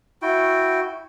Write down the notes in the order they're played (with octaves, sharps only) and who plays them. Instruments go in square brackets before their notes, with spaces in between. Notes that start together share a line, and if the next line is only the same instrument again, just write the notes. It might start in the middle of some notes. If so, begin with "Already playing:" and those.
[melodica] E4 F#4 G5